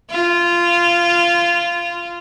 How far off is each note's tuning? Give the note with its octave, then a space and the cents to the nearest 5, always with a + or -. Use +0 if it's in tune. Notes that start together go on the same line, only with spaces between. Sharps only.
F4 -15